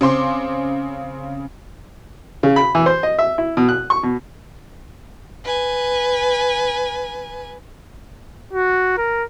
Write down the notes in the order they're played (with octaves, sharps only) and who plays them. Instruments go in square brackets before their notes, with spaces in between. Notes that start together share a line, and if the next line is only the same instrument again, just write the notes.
[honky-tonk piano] C#3 C4 C6 D6
[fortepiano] C#3
B5
E3
C5
D#5
E5
E4
B2
F#6
C#6
B2
[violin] B4 G#5
[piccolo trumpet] F#4
A#4